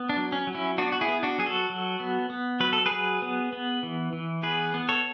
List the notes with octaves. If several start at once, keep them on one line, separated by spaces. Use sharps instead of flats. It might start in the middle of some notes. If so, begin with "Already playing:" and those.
Already playing: B3
D4
F#3
C#4
F#3
C#4 E4
B3 D4 F#4
F#4
E4 G#4
B3
D4 F#4
F#3 G#4
F#4 A4
F#3
B3
B3
F#3 B4
A4
G#4 B4
F#3
B3
B3
E3
E3
B3 G#4 B4
B3
A4 C#5